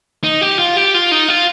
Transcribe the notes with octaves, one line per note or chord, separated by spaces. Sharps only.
D#4
G4
F4
G4
F4
D#4
F4